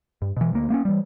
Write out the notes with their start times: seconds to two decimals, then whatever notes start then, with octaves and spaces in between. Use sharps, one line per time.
0.22 G2
0.37 B2 E3
0.53 D2 A#3
0.70 A#3 B3 C#4
0.85 E3 G3